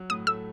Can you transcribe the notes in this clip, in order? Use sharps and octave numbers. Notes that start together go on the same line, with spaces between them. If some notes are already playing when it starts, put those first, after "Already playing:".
Already playing: F#3
A2 D#6
A3 E6